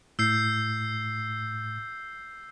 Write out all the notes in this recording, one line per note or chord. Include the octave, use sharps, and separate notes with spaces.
A2 E6 G6 C7